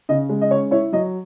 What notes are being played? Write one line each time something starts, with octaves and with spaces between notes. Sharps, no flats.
C#3 D#5
G#3
D#5
C#4 C#5
E4 C#5
F#3 D#5